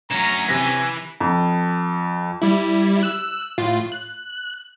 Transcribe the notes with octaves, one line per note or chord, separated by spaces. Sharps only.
D2 F#3 C#4 F#4 A#5 E7
C3 E3 B4 G#5 A#6 B6
F2
G3 E4
E6 F#6
A2 F4
F#6